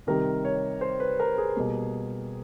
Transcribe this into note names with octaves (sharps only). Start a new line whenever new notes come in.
C3 D#3 G3 A#4
C#5
C5
B4
A#4
G#4
B2 G3 A#3